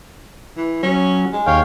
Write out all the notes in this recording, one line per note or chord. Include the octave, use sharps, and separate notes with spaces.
E3
F#3 C#4
G#3
D#2 C#5 F5 G5